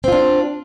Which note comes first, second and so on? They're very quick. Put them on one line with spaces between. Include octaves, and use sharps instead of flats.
C4 F4 D4